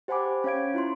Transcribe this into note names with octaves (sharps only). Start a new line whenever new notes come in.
G4 C5 F#5 G#5 B5 D6
C#4 C#5 F5 G#6 D7
E4 F4 C6